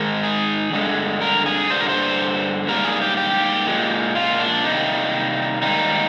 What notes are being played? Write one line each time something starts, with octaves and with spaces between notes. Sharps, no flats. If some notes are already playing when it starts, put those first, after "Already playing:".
Already playing: G#2 D#3 G#3 A#4
G#4
G2 D3 G#3
A#4
G#4
G2 D3 G3 C5
A#4
C5
G#2 G3 A#3 A#4
G#4
G4
G4
A#2 G#3
F4
D4
C3 D#3 G3 A#3 D#4
G#2 D#3 G3 A#3 D#4